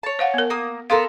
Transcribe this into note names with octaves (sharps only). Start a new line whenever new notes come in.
C#5 A5
C5 F5 F#5
B3 A#4
A#3 D#6
B3 A4 A#4 F5 C6